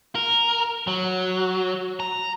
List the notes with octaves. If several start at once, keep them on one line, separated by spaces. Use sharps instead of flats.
A#4
F#3
A#5